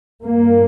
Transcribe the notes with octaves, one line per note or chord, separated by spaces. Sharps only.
G2 A#3